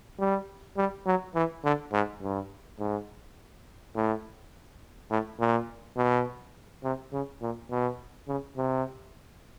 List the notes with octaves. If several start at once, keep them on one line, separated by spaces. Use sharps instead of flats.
G3
G3
F#3
E3
D3
G#2
G2
G#2
A2
A2
A#2
B2
C3
C#3
A#2
B2
C#3
C3